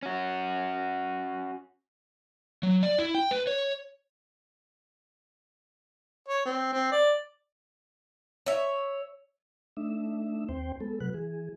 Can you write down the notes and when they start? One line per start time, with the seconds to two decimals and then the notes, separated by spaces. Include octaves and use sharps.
0.03 C#4 F#4
2.63 F#3
2.83 D5
2.98 E4
3.15 G5
3.31 B4
3.47 C#5
6.29 C#5
6.46 C4
6.72 C4
6.92 D5
8.46 C#5 E5
9.77 A3 D4 D#4 E5
10.49 D#2 C4 C5 G5
10.80 G#3 B3 A4
11.00 C3 F#3 B4 F#6
11.14 E3 G#4